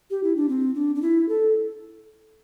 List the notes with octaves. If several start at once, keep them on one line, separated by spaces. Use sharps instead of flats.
G4
E4
D4
C4
D4
D4
E4
A4